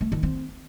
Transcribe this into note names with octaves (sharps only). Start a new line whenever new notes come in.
A3
D#3
C4